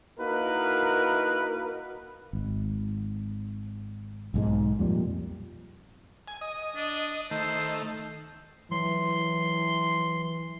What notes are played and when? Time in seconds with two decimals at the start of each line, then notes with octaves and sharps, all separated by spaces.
0.19 A#3 D#4 E4 F#4 A#4 B4
2.33 G#1
4.34 B1 G#2 G#3
4.79 F2 A#2 G3
6.28 G#5
6.41 D#5
6.76 D4
7.31 D#3 A3 C5
8.71 E3 F#3 C6